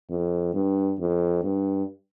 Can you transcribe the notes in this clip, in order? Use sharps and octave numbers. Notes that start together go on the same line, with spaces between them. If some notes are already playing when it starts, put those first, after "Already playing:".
F2
G2
F2
G2